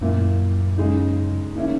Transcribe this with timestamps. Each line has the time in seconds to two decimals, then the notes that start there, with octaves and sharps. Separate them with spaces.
0.01 F#2 A#2 A#3 E4
0.78 C#3 G#3 D#4
1.55 D#3 A#3 C#4 E4